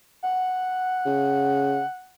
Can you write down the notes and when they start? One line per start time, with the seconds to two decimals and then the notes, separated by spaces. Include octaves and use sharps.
0.23 F#5
1.06 C#3